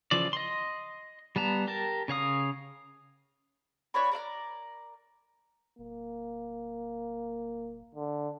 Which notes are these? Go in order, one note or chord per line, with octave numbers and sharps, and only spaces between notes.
C#3 E3 F3 D5
D#5 C6
G3 B3 A5 A#5
G4 A#4 A5
C#3 C#5 F5 D#6
D4 F#4 C#5 B5
A#4 D5 E5 A#5
D1 A#3
D3